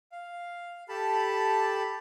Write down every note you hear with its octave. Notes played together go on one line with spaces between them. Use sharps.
F5
G4 A4 A5 B5